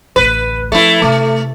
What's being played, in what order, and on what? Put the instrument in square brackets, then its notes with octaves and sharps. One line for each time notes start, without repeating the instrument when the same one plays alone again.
[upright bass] A1 D2 [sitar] B4
[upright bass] F3 [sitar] A3 E4
[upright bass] C3 [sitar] A3